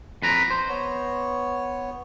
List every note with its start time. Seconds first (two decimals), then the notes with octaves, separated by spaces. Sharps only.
0.22 F2 B4 A#5
0.51 C5
0.69 B3 C#5